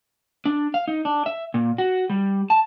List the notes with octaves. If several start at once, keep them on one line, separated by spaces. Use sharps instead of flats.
D4
F5
D#4
D4
E5
A#2
F#4
G3
A5